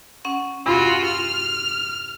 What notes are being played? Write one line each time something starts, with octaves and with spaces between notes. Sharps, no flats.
C#4 F#5
E2 G2 C3 F4 F#4
F6